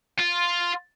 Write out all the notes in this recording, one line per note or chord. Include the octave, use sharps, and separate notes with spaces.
F4